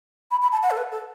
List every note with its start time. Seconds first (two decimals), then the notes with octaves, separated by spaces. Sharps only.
0.31 B5
0.42 B5
0.52 A5
0.63 F#5
0.71 A4
0.77 B4
0.92 A4